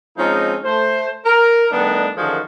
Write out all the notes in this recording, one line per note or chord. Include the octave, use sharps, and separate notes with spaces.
F3 G#3 C4 C#4 D#4
A3 C5
A#4
D#3 G3 A3 B3 D4 D#4
F#2 D3 D#3 F3 F#4 G#4